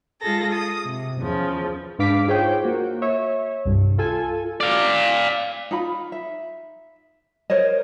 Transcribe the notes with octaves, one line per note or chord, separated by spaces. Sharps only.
G#3 F4 G#4 A4 A#6
D#6
C3
E2 C#3 F3
G#2 D4 B4 F5 D6 B6
D#4 F4 G#4 C5 C#5 G5
A#3 F#4
C#5 E5
C2 G2
F4 A4 G#5
D5 F5
D#4 F4 B5
E5
A#4 C5 C#5 D#5